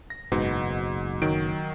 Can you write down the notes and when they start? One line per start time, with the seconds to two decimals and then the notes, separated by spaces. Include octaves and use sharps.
0.10 A#6
0.32 F#1 G#2 B2
1.22 D#3 F#3 D7